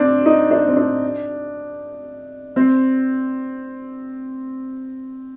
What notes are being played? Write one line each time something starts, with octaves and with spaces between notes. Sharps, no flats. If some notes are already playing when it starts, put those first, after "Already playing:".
Already playing: C4 D4
D#4
D4
C4
D4
C4